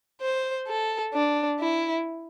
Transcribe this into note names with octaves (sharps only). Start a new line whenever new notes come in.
C5
A4
D4
E4